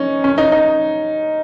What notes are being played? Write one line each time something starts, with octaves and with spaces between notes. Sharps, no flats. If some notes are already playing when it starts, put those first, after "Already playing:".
Already playing: C#4 D#4
C#4
D#4
D#4